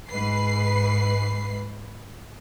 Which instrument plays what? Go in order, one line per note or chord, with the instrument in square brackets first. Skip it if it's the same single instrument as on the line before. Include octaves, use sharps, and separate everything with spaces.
[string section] G#2 B4 C7